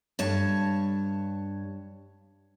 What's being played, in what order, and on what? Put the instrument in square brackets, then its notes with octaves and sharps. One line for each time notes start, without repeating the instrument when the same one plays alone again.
[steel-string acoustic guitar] G2 C#5 A5